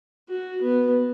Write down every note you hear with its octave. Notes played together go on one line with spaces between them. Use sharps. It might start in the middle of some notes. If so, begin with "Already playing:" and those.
F#4
B3